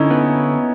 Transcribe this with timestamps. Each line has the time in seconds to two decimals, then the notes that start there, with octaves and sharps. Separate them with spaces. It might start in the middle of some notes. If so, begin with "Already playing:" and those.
Already playing: D3 C#4 D#4 E4
0.10 B3